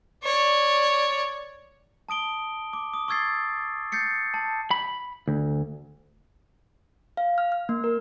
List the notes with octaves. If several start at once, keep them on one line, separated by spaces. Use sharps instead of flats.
C#5 D5
A5 D#6 D7 G7
D6
D#6
C#6 D#6 E6 G#6 A6 C7
G6 A6 C7 C#7
A5
B5
D2
F5
F6
F6
A#3
A#4